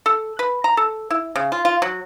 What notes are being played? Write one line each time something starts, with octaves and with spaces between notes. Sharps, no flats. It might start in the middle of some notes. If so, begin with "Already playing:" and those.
A4
B4
A#5
A4
E4
C#3
F4
F4
F#3